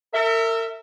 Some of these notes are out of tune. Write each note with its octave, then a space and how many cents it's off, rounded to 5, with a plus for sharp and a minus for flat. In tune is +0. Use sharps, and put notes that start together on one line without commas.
A#4 -40 E5 +0